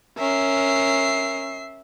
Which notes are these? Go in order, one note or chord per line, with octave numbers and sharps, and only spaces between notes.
C#4 A#4 E5 C7